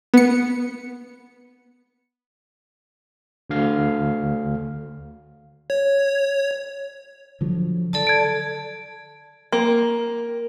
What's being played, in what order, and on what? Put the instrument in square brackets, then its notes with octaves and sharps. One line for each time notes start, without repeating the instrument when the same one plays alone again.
[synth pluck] B3 C#7
[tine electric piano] D2 D3 F5
[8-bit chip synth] C#5
[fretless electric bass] D3 F3 F#3
[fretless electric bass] D3 [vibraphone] A4 D5 A5
[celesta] G#6 D7
[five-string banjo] A#3